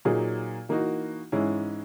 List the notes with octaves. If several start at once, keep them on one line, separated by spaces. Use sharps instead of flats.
A#2 F#3 A#3 D#4 G#4
E3 A#3 D#4 F#4
G#2 E3 G#3 C#4 E4